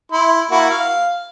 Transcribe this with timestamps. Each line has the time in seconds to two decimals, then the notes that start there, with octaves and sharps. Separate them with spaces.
0.12 E4 C6
0.51 A#3 E4 F#4
0.70 F5